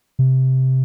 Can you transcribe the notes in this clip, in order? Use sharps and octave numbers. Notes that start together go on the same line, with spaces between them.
C3